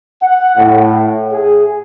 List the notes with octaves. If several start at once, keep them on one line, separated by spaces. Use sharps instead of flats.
F#5
A2
G#4